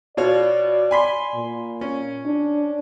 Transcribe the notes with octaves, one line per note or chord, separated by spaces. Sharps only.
B2 F4 C#5 D5
G#5 B5 C6
A#2
C#4
D4